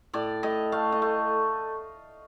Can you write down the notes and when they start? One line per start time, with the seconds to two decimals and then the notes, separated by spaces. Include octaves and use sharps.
0.13 A2 D5
0.43 A2 D#5
0.72 A3 F5
0.92 D#5
1.02 A3